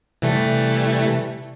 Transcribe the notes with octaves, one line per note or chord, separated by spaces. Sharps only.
C3 E3 G3 A3